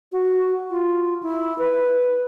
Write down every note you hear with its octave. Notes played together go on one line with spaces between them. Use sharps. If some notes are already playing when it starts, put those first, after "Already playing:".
F#4
F4
E4
B4